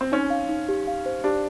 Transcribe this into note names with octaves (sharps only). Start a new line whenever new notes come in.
C4
C#4 D#4
F5
D#4
G4
F5
C5
D4 G4